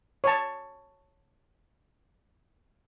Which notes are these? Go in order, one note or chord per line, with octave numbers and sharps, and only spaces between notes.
C#5 A5